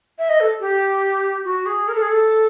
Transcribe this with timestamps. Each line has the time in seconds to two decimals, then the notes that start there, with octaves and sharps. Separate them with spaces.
0.19 E5
0.29 D#5
0.40 A4
0.60 G4
1.45 F#4
1.66 G#4
1.88 A#4
1.94 A4
2.02 G#4
2.08 A4